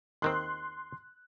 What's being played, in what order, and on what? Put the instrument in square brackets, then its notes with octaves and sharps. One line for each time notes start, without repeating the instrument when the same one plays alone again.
[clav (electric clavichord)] D#2 D#3 C4 [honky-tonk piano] C6 F#6